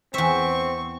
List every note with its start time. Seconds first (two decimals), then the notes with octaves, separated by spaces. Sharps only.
0.14 E2 C4 E5 C#6